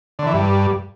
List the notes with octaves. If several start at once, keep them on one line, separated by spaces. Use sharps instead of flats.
D3
E3
G2